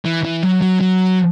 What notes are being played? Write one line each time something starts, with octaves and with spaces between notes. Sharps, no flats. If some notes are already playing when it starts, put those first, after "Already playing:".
E3
E3
F#3
F#3
F#3